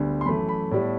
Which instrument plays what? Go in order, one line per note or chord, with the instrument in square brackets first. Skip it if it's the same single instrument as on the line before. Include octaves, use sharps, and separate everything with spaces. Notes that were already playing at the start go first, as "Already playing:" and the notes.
Already playing: [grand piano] D2 D3 G3 B3
C6
F#2 E3 A3 B5
B5
A2 G3 B3